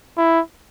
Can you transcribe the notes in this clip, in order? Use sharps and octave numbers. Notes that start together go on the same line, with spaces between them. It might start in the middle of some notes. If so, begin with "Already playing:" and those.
E4